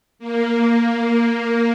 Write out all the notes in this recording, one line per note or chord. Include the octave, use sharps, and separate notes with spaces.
A#3
A#3